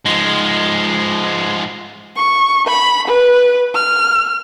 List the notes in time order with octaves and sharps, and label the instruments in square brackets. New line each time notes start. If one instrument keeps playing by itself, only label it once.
[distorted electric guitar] G#2 F3 [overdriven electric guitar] G#3
[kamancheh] C#6
B5
B4
F6